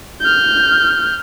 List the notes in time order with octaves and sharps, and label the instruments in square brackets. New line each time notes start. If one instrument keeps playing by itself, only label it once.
[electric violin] F6 G6